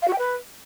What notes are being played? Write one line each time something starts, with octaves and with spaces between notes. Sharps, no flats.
F5
F#4
G5
B4